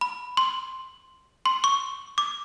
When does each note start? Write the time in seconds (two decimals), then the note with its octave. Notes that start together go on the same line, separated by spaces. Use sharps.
0.01 B5
0.37 C6
1.46 C6
1.64 C#6
2.18 D6